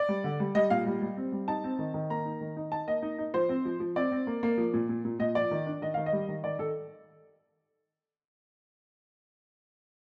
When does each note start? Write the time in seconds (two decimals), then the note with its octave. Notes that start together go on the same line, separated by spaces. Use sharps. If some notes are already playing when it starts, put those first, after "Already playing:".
Already playing: D5
0.09 G3
0.24 D3
0.40 G3
0.55 G3 D#5
0.70 A#2 F5
0.86 G3
1.02 G3
1.17 C4
1.32 G3
1.48 D#4 A5
1.64 C4
1.79 D#3
1.94 D#3
2.10 A#3 A#5
2.25 D#4
2.41 D#3
2.57 D#4
2.72 D#4 A5
2.87 A#3 D#5
3.02 D#4
3.18 D#4
3.34 F3 C5
3.49 C4
3.65 F3
3.80 F3
3.96 C4 D5
4.12 C4
4.27 A#3
4.43 A#3
4.58 F3
4.73 A#2
4.89 A#2
5.05 A#2
5.19 A#2 D#5
5.35 F3 D5
5.51 D#3
5.66 D4
5.82 D#3 D#5
5.94 D#3 F5
6.06 D#5
6.12 G3
6.29 D#3
6.44 D#3 D5
6.59 D#3 A4